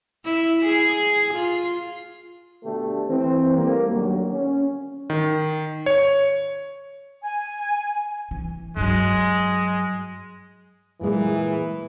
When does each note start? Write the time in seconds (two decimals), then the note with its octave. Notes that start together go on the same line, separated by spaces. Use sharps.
0.25 E4
0.65 G#4
1.33 F4
2.65 B2 D3 A3 D4 G4
3.07 E3 C4
3.56 G3 A3 A#3
3.91 D#2 D3 F#3
4.30 C#4
5.10 D#3
5.86 C#5
7.22 G#5
8.31 E3
8.77 G2 F#3 G#3
11.01 A#2 E3 G#3